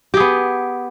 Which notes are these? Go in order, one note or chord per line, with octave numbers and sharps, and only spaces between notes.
B3 G4 G#4